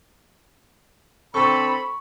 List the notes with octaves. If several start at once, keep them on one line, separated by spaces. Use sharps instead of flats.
D3 C4 A4 B5 C#6